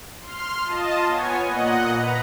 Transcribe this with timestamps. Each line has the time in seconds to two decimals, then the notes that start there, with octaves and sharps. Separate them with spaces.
0.21 C6 F6
0.64 F4 D#5 A5
1.07 B3 C#5 G#5
1.43 A#2 D#5 F#5
1.92 B4 A#5